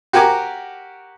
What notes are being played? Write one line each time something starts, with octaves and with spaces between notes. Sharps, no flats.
F#4 G4 A#4 G#5 D6